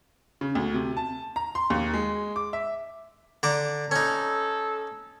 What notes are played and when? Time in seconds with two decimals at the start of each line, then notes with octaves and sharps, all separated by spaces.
0.41 C#3
0.55 D2
0.74 C3
0.97 A5
1.36 A#5
1.55 C6
1.70 D#2
1.93 G#3
2.36 D6
2.53 E5
3.43 D3 A#5 D6
3.91 C#4 D#4 A4